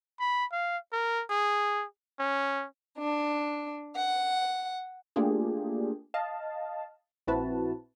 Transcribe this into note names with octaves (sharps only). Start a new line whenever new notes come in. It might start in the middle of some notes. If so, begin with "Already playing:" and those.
B5
F5
A#4
G#4
C#4
D4
F#5
A3 A#3 D4 F4 G4 G#4
D#5 F5 A5
A#1 C4 E4 F#4 B4 A5